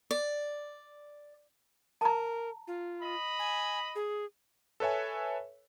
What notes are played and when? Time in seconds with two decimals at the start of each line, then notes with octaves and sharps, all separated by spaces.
0.11 D5
2.01 A#4 A5 A#5
2.67 F4
3.01 D#5 B5
3.39 G#5
3.95 G#4
4.80 A4 B4 C#5 E5 G#5